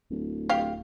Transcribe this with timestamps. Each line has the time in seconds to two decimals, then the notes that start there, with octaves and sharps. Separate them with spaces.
0.11 D1
0.49 G4 F5